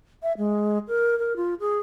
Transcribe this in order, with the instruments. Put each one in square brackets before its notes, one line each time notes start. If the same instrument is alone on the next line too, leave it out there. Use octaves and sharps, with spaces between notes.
[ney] E5
G#3
A#4
A#4
F4
G#4